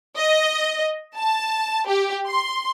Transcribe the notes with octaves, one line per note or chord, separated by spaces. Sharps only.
D#5
A5
G4
C6